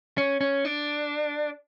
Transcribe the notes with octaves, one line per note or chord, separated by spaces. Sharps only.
C#4
C#4
D4